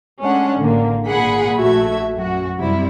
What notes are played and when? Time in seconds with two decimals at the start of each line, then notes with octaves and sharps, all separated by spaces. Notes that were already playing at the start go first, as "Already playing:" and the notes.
0.21 G#3 A3 C#4 D4 F#5
0.57 A1 D3 A#3
1.08 G#1 A#2 G#4 F#5 B5
1.55 A#1 A3 F#4 E5 G#6
2.15 F#2 F#4
2.58 F#2 C3 G3 E4